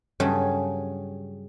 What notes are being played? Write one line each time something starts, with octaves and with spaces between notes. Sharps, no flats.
G2 C#3 F#3 G3 A3 G#4